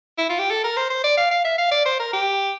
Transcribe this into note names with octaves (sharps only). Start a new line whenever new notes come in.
E4
F4
G4
A4
A#4
C5
C5
D5
F5
F5
E5
F5
D5
C5
A#4
G4